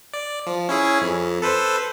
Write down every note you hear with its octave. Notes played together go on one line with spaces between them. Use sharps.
D5
F3
C#4 E4 G#4
F2
A4 B4 C5